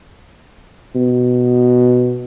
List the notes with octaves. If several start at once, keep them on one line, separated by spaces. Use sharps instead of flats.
B2